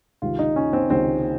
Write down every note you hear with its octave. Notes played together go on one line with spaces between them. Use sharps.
C#2 C3 D#3 F4
D#4
C#4
C4
C#2 C3 D#3 C4